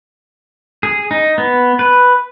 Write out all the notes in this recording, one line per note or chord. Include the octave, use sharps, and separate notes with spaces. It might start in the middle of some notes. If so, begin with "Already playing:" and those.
G#4
D#4
B3
B4